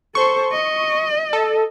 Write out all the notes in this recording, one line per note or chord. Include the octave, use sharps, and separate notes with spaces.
A4 C5 C#6
D#5
A4